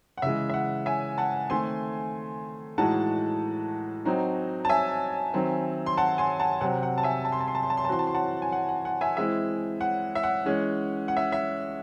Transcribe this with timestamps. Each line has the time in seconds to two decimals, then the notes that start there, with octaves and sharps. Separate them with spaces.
0.17 F#5
0.22 C#3 E3 G#3 E5
0.49 E5
0.54 F#5
0.86 E5 G#5
1.18 F#5 A5
1.50 D#3 A3 C4 G#5 C6
2.78 A2 E3 G#3 D#4 F#4 F#5 A5
4.05 F#3 C4 D#4 F#4
4.65 A5
4.69 E5 G#5
5.34 D#3 F#3 C4
5.86 C6
5.97 F#5 A5
6.18 G#5 C6
6.40 F#5 A5
6.61 C3 F#3 C4 F#5
6.83 F#5
6.98 A5
7.03 E5 G#5
7.25 A5
7.32 C6
7.40 A5
7.48 C6
7.55 A5
7.63 C6
7.70 A5
7.77 C6
7.85 A5
7.89 E3 C4 F#4 C6
7.99 A5
8.07 C6
8.14 F#5 A5
8.42 G#5
8.52 F#5
8.69 F#5
8.85 F#5
9.01 E5 G#5
9.16 E3 G#3 C4 E4 E5
9.81 F#5
10.15 E5
10.23 F#5
10.45 E3 G#3 C#4
11.08 F#5
11.17 E5
11.32 E5